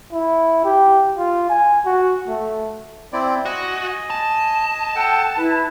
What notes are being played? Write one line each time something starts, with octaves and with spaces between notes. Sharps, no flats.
E4
G4
F4
G#5
F#4
A3
C4 E4 D5
F#4 D#5 G#5
A5
A4 F#5 G5
E4 B4